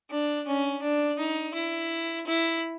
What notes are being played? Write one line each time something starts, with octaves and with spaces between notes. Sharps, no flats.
D4
C#4
D4
D#4
E4
E4